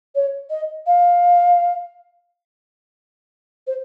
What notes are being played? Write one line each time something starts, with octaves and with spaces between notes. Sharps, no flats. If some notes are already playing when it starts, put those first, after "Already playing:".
C#5
D#5
F5
C5